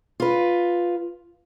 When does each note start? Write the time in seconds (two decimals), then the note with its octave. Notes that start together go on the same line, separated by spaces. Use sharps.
0.20 F4 B4